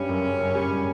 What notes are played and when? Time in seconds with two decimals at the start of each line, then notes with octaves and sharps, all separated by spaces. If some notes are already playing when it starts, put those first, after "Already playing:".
Already playing: G2 G3 C#4
0.09 F#2
0.24 C#3
0.40 F#2
0.55 G3